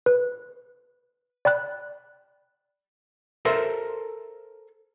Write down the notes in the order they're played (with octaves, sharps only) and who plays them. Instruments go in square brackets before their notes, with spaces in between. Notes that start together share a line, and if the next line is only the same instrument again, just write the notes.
[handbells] B4
D5 G5 B5 F#6
[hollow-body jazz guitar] A4 A#4 C5 E5